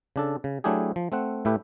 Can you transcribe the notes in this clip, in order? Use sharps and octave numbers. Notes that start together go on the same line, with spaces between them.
C#3 D4 A4
C#3
F#3 A3 D4 E4 G4 G#4
F3
A3 C4 F#5
A2 A3 E4 G4 B4